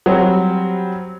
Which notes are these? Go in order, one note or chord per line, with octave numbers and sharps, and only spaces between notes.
F#3 G3 C4